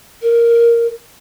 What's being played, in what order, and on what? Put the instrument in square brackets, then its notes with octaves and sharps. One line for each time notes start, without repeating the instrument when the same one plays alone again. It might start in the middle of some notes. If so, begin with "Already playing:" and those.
[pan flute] A#4